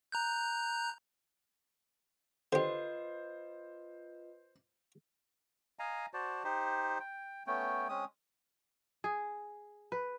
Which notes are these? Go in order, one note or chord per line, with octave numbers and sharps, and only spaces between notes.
A#5 F#6 G6
D3 F4 G4 B4 C5 D#5
D#5 F5 G#5 A#5
F#4 C5 D5 A5
D#4 G4 C5
G5
A3 B3 C#4 G5
G#3 C4 C#4 D#6
G#4
B4